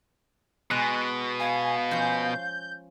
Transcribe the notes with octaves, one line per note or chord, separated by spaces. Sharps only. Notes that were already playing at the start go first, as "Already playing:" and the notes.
B2 G#3 F#6
F5 G#5
F3 C#4 G6